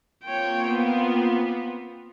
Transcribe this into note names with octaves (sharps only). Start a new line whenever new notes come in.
A#3 C4 F4 C#5 G5
B3